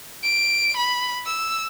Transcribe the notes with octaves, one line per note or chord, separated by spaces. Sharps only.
D7
B5
E6